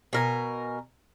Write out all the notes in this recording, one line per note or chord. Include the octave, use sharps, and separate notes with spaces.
B2 A#4 G#5